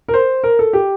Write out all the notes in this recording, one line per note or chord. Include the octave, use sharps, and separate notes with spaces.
A#4
C5
A#4
A4
G4